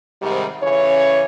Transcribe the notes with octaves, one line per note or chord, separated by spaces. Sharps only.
G#2 C3 D#3 G3
C#3 E3 C#4 C#5